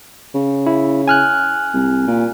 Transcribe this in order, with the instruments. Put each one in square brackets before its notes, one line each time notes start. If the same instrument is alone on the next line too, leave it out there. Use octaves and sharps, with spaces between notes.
[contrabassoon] C#3
[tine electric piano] E4
G#5 F6 F#6
[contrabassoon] C2
A#2